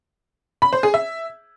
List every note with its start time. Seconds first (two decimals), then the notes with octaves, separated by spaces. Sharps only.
0.62 B5
0.73 C5
0.83 G#4
0.94 E5